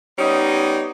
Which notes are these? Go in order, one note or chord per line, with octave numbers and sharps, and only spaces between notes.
G3 B3 C#4 D#4